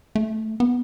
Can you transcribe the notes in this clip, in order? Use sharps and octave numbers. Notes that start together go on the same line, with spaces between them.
A3
B3